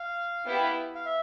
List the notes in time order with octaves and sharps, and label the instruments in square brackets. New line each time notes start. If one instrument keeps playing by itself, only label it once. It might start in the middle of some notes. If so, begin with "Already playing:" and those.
Already playing: [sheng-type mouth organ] F5
[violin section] B3 E4 G4
[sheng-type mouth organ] F5
E5